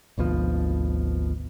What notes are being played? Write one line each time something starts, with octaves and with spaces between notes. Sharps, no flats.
G#1 D2 B2 F3